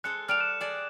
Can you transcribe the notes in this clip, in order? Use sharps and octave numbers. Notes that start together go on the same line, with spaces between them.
G#3 A4 C5 F#6 C#7
G3 A4 D5 F6 D7 F7
D6 F#6 E7
G#4 D5 D#5